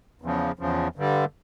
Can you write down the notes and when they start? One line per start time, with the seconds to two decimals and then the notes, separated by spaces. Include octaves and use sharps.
0.22 E2 C#3 F3
0.59 E2 C#3 F3
0.96 G2 D3 G3